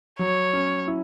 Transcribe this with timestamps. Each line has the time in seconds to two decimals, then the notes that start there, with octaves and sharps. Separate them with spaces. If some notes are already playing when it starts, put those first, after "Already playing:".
0.19 F#3 C#5
0.53 C#4
0.88 E4